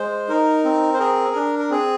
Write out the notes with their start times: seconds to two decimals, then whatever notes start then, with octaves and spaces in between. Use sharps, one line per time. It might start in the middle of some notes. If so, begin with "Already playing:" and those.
Already playing: G#3 C5
0.28 D#4 A#4
0.64 C4
0.94 C5
0.99 G#4 A#4
1.35 D4
1.59 A#4
1.70 C4 G#4